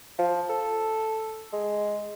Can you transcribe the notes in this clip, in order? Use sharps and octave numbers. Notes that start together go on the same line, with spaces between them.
F3
A4
G#3